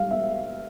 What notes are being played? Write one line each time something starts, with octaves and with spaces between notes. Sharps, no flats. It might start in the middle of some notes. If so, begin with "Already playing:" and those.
Already playing: G3 F5
B3 E5